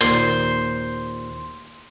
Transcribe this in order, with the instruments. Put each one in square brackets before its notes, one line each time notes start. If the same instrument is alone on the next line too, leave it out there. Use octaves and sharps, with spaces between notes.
[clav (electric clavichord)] D#2 A#2 [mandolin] C5